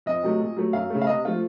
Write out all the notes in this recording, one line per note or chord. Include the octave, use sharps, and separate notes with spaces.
F2 D#5
C3 F#3 A3
A#2
F#3 A3
F#2 F5
C#3 A3
F5
C3 D#5
F3 A3 F4